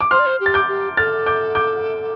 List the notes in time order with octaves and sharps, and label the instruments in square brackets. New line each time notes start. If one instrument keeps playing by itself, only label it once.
[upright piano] D6
[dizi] C5 [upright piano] C6 F6
[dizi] D5
C5
G4
[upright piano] A6
D6 G6
[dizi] G4
[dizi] A4 [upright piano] F6 A6
[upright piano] D6 G6
D6 G6